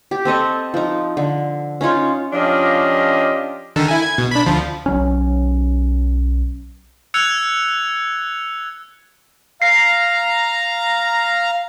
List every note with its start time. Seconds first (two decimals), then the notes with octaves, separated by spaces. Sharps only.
0.11 G4
0.25 C4 A4 D#5 C#6
0.74 F3 D#4
1.17 D3
1.81 C#4 D#4 F4 C#5
2.33 F3 C#4 D4 F4 G4 D#5
3.76 D3 D#3 A4
3.88 E4 G#5
4.02 G#6
4.18 B2
4.31 D4 B5
4.46 D2 F3
4.86 B1 F#3 C#4
7.14 E6 F#6 G#6 C#7 F7
9.62 F5 A#5 C7